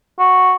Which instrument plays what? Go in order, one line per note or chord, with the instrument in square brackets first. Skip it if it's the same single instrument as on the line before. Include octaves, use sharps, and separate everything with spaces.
[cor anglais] F#4